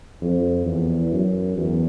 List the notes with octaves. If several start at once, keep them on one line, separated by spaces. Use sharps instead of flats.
F2
E2
F#2
E2